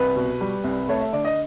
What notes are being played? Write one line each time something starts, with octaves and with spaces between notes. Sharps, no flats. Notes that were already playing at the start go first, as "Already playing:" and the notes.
Already playing: C2 B4
B2
G3
C2
A3 C#5
E5
D3 D5
D#5